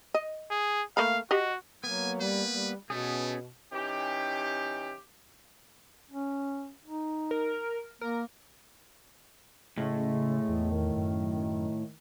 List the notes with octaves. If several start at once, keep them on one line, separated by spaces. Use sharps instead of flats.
D#5
G#4
A3 A#3 F5 B5
F#4 G4 D#5
F#3 A#3 B3 G#5
G3 B4
G3
B2 A3 B3 C#4 G#4
E3 C#4 D#4 G4
C#4
D#4
A#4
A#3 A#4
A2 C#3 G#3 A3
E2
D#3
F#2